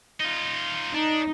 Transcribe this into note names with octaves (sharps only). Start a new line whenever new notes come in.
D#4 F4
D4 D#4